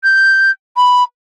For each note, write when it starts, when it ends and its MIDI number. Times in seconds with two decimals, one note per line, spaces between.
0.03 0.50 91
0.76 1.03 83